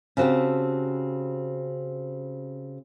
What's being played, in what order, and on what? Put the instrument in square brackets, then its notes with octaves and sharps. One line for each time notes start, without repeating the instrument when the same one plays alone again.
[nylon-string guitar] C#3 C4 F#4 G4 A4